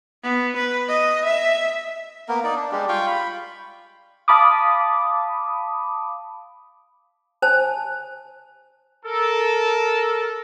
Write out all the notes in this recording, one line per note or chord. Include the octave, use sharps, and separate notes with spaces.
B3
B4
D#5
E5
A#3 B3 A#4
D#4 D5
D4
G3 G#3 G4
F4 F5 G5 C#6
B5
F5 A5 B5 D6 D#6
C5 G#5 A5
A4 A#4